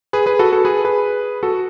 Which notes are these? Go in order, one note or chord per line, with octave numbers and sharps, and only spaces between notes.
G#4 B4
G#4 B4
F#4 A4
F#4 A4
G#4 B4
G#4 B4
F#4 A4